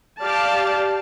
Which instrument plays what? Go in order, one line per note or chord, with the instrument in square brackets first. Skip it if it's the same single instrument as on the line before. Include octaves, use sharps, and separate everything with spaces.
[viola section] G4 D5 F5 A5